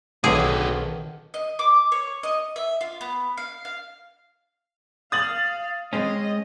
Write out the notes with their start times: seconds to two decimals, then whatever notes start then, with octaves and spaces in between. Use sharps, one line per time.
0.24 B1 D3 D#3 C4 F#4 G#4
1.34 D#5
1.59 D6
1.92 C#5
2.23 D#5
2.56 E5
2.81 F4
3.01 B3
3.37 F5
3.65 F5
5.12 F5 D#6 A6 F#7
5.93 G#3 C4 C#4 D#5